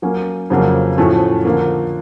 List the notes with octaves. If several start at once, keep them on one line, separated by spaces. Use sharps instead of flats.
F#3 A#3 C#4
F2 C#3 F#3 A#3 C#4
A2 F3 A3 C#4 F#4
D3 F3 A#3